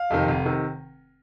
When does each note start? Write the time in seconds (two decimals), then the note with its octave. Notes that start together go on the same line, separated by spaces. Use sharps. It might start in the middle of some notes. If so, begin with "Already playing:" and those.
Already playing: F5
0.10 F2 C3 D#3
0.28 F1
0.45 C3 D#3